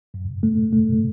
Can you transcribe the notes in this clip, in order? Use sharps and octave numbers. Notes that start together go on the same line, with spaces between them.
F#2
A3
A3